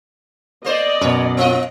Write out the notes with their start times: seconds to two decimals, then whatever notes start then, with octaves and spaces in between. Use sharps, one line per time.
0.65 A#3 C5 D5 D#5
1.01 F#2 B2 C#5
1.37 B3 F4 D#5